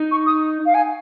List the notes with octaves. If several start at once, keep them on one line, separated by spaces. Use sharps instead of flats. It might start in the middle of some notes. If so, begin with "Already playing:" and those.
Already playing: D#4
C#6
D#6
F5
G#5